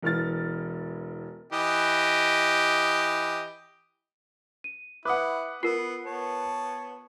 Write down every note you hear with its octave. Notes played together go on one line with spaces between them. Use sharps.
E1 E3 F6 A6
E3 G4 D#5
D#7
E4 B4 F#5 D6 D#6
B3 F4 A#4 C7
B3 C#5 A5